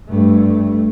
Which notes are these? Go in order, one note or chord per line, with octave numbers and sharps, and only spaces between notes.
G2 A3